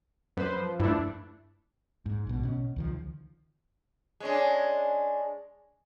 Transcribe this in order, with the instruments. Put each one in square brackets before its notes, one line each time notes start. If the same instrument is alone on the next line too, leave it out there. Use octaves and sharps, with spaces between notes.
[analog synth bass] F#2 [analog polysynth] B4 C5
[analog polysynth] F3
[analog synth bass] G2 [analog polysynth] A3 D4 E4
[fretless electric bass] G#2
A#1 B2
B2 C#4
C#2 D#3 F3
[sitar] G#3 C#4 D4